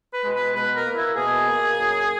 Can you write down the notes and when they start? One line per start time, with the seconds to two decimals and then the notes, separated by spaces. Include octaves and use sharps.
0.13 B4
0.24 B2 G#3
0.34 B4
0.54 B2 B4
0.75 A#4
0.85 A#3
0.96 E4
1.16 B2 G#4
1.47 A#3
1.78 F#2